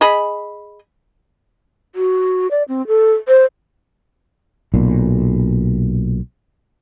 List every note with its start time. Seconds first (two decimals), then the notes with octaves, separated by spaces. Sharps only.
0.01 G#4 D#5 B5
1.95 F#4
2.51 D5
2.68 C4
2.87 A4
3.28 C5
4.74 B1 A#2